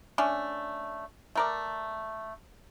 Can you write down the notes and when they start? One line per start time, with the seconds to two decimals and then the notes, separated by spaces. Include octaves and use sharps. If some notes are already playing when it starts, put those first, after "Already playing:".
0.18 A3 C#4 D4
1.36 A3 A#4 D5